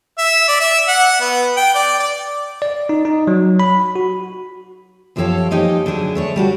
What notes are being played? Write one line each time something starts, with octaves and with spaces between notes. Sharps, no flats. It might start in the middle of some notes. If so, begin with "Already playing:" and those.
E5
D5
E5
F#5
B3
G5
D5
D5
D5
D#4
D#4
F#3
B5
F#4
F#2 F3 G4 A4 C#5 F5
F3 A#3 D#4 G4 D#5 G#5
D3 F#3 D4 G#4
A3 D4 C#5
G3 D4 F#4